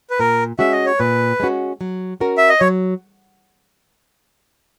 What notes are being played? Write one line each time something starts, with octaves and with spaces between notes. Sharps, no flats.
B4
A#2 A#4
G#3 C#4 F#4 E5
D#5
C#5
A#2 B4
G#3 C#4 F#4
F#3
C#4 F#4 A#4
E5
D#5
F#3 C#5